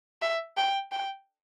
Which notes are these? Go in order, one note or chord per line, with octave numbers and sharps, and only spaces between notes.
E5
G5
G5